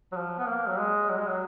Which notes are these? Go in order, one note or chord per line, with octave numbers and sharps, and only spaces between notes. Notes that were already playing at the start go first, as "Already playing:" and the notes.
F#3
F3
B3
A#3
F#3
G#3
F#3
G#3
F#3